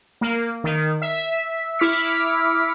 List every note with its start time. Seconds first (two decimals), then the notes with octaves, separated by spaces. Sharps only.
0.21 A#3
0.64 D#3
1.02 E5
1.79 E4 D6 F6 B6 C#7